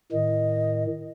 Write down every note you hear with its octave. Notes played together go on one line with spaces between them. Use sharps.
A2 D#3 D#5